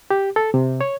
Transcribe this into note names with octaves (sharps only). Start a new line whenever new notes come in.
G4
A4
C3
C#5